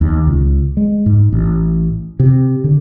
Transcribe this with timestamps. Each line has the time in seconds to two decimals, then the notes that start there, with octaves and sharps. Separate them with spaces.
0.01 D#2
0.27 C#2
0.77 G#3
1.06 G#2
1.32 A1
2.20 C3
2.64 D3